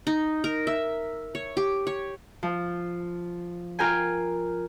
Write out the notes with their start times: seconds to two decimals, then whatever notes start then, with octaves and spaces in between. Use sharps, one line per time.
0.07 D#4
0.44 A#4
0.67 E5
1.35 C#5
1.57 G4
1.87 C#5
2.43 F3
3.79 F4 A#4 G5 G#5